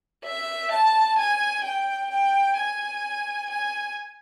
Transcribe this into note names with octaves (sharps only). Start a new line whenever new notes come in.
E5
A5
G#5
G5
G5
G#5
G#5